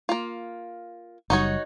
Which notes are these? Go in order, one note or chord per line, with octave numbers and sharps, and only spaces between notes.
A#3 F4
F#1 G3 D#4 F#4 C#5